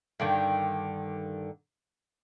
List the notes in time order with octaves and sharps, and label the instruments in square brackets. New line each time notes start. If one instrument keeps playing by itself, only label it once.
[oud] G2 D3 D#3